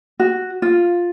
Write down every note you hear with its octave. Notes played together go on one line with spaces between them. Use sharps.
F#4
F4